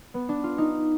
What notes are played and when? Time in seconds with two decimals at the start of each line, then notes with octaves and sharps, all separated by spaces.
0.14 B3
0.29 D4
0.44 F4
0.58 D#4